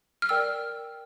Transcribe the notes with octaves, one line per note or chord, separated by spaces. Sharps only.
F6
A#4 D5 G5 E6